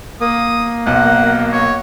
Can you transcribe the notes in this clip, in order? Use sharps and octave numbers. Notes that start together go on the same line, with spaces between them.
A#3 D#6
B1 F#5
C#5